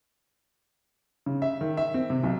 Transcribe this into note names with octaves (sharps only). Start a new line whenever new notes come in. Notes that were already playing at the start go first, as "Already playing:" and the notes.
C#3
E5
D#3
E5
C4
C3
B1